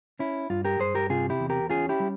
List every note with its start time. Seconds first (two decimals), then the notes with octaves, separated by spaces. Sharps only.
0.19 C#4 E4
0.50 G2 F4
0.65 G4 A#4
0.80 G2 G#4 C5
0.95 G4 A#4
1.09 C3 F4 G#4
1.30 E4 G4
1.40 E2
1.50 G4 A#4
1.70 C#4 F4 G#4
1.89 E4 G4
2.00 G3